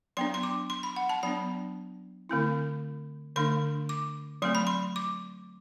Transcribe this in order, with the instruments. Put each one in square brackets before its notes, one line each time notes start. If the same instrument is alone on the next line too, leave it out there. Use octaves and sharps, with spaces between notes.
[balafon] F#3 B3 D4 C6
C6
D6
C6
B5
F#5
A5
F#3 B3 D4 B5
D3 A3 C4 E4
D3 A3 D4 C6
D6
F#3 A3 C4 C6
B5
C6
D6